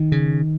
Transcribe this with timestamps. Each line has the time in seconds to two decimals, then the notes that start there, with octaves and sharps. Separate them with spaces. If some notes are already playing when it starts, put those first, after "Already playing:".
Already playing: D#3
0.12 C#3